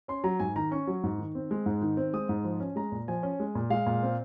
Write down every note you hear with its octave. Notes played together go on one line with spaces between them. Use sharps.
C#4 C6
F#3 A#5
G#2 G#5
D#3 A#5
C#4 C#6
F#3
G#2
D#3
C4
G#3
G#2
D#3
C4
G#3 D#6
G#2
F3
C#4
G#3 A#5
A#2
F3 G#5
C#4
G#3
A#2
G#3 F5
A#2
C4